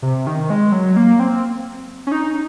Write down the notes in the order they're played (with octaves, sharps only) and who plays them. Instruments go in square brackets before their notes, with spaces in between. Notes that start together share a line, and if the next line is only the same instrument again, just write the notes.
[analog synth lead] C3
D#3
G#3
F#3
A#3
C4
C#4
D#4